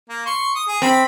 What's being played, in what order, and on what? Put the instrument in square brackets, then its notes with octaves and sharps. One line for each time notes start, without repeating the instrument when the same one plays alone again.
[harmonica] A#3
C6 C#6
D#6
G#4
[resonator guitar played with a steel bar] C4 [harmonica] B5